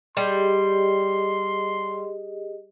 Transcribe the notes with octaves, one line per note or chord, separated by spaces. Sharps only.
G3 G4 G#4 D#5 C6